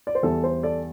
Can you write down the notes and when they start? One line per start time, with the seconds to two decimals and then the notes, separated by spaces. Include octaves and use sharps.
0.07 D5
0.15 C5
0.23 E2 E3 G3 A4
0.44 C5
0.63 A4 D5